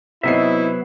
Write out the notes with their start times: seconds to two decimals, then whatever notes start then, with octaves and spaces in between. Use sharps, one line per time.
0.23 C3 F#3 B3 D#4 E4 E5 C7